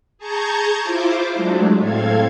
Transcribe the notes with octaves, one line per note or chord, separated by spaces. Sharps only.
G#4 A5 A#5 C#6 G6 G#6
E4 F4 C5 D6
F#3 G#3 A3 D4
A2 C4 A4 F5 G#6